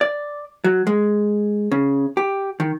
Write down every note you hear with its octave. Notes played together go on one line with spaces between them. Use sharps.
D5
F#3
G#3
C#3
G4
D#3